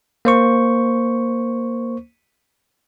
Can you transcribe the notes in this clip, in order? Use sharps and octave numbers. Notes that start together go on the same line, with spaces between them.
A#3 C5 C#6